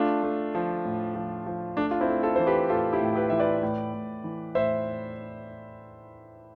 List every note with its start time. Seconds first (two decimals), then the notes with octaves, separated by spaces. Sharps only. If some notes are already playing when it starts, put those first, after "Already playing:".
Already playing: A3 D4 F4
0.23 A3
0.55 F3
0.85 A2
1.15 F3
1.46 F3
1.77 A3 D4
1.91 F4
2.00 C4 E4
2.08 A3
2.23 F4 A4
2.36 E3 C5
2.47 G4 B4
2.70 A2 F4 A4
2.93 E4 G4
3.01 A2
3.15 G4 B4
3.30 E3 E5
3.39 B4 D5
3.63 A2
3.93 A2
4.24 E3
4.55 A2 C5 E5